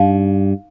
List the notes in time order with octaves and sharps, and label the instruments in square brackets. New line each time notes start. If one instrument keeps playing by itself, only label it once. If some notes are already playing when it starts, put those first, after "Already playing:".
Already playing: [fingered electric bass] G2 [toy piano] D#4 F5